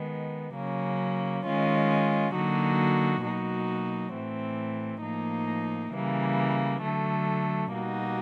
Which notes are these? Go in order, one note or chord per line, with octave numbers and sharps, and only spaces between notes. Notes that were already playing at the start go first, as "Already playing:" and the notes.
Already playing: D#3 G#3 B3
C#3 F#3 A#3 C#4
D#3 G#3 C#4 F4
D3 F#3 A#3 D#4 F#4
B2 F#3 A#3 D#4 F#4
A2 E3 A3 C4
A2 F3 A#3 D#4
C#3 E3 G3 A#3
D3 F#3 A3
B2 G3 A#3 D#4 F#4